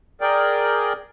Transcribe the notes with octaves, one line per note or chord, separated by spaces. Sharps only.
G#4 A#4 D5 G5